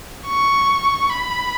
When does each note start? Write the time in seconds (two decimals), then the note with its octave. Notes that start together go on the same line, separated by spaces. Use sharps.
0.27 C#6
1.10 B5